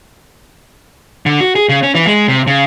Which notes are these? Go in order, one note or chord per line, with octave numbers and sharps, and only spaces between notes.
D3
F#4
G#4
C#3
C#4
E3
G#3
C3
C#3